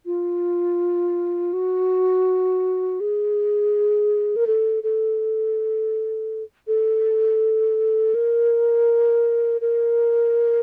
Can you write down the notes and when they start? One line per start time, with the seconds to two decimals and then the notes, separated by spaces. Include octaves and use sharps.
0.06 F4
1.53 F#4
3.00 G#4
4.36 A#4
4.47 A4
4.83 A4
6.67 A4
8.14 A#4
9.61 A#4